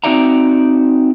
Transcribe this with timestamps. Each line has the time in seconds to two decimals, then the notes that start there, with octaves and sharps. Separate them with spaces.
0.04 C4 D#4 F#4 D5 E5 A#5